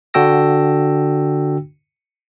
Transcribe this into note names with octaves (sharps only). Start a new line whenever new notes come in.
D3 D4 F#4 G5 E6 A#6